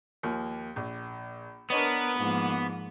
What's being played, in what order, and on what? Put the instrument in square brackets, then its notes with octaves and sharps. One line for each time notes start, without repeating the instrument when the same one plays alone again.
[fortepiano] D#2 F3 A#3
A#1
[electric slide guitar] B3 [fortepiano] D4 C#5 D#5 [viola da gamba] A#4 B4
[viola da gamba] G#2 F3 A#3